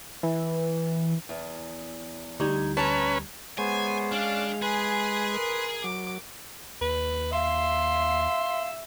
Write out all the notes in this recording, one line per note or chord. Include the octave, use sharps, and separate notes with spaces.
E3
E2
D2 G3 D#4 G#6
C#4 B4 A5 A#5
G#3 B3 C5 C#5 G#5
C#4 D4 D5 F5 F#6
G#4 B4 G#5 C6
A#4
F#3 D6
D#2 B4
E5 F5 C6